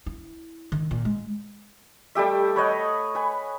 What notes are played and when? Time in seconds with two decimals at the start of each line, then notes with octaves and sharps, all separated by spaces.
0.06 E4
0.72 D#3
0.91 A#2
1.05 G#3
2.15 G3 A3 G4 E5
2.56 B4 C#5 D#5 F#5
3.15 B4 G#5